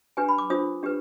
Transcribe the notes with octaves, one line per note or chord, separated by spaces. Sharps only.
D4 G4 B4 G#5
B5
D6
D4 F4 C5 D#6
D4 G4 B4